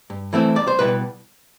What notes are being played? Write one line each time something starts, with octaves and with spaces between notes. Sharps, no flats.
G2
E3 A3 C4 E4
C2 D5
C5
B2 G3 B3 E4 B4